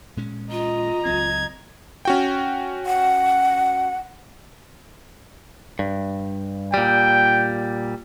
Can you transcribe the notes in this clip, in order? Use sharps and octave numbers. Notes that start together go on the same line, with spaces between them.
A#2 G#3 C#4
F4 D#5 A#5
C#2 F#3 C4 G#6
C#4 F#4 G5
F#5
G2
A#2 G3 G5